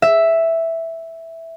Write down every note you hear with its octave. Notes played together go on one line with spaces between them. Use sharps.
E5